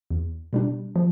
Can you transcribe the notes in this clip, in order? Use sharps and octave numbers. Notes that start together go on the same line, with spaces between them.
E2
B2 G3 D4
F3